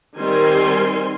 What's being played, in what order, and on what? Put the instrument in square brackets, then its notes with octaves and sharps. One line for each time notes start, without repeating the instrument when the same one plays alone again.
[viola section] D#3 G3 C4 A#4 G#5 C6